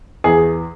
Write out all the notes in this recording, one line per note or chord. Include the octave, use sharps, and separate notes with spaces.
E2 G#4